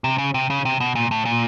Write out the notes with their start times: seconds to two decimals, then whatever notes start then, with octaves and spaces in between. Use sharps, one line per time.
0.04 C3
0.18 C#3
0.34 C3
0.50 C#3
0.65 C3
0.80 B2
0.95 A#2
1.11 A2
1.25 A#2